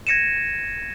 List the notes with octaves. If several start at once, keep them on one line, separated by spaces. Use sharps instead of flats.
G#6 A#6 C#7 D#7 E7